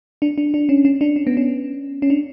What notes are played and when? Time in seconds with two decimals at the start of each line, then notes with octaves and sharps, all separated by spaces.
0.22 D4
0.38 D4
0.54 D4
0.69 C#4
0.85 C#4
1.01 D4
1.16 C#4
1.27 B3
1.37 C#4
2.02 C#4
2.10 D4